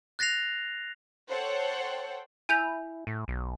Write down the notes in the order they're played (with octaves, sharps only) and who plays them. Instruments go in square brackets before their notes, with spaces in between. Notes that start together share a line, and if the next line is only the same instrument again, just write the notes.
[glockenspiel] F#6 A6 A#6 C7 F7
[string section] A4 C5 C#5 F#5 G5
[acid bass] E4 [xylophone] G#5 G6 F7
[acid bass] A2
B1